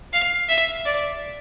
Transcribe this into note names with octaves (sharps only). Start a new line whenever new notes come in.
F5
E5
D5